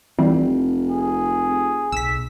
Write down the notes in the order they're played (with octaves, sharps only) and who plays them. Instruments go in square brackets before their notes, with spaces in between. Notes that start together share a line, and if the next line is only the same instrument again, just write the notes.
[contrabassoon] F1 [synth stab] E3 G3 [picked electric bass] C4
[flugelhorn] G#4
[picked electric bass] B1 [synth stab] E6 B6